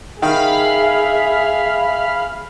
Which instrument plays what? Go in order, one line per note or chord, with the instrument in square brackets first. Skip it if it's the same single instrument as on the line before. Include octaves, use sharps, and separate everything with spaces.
[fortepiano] D#3 [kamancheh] G#4 [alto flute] E5 [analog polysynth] F5 B5 F6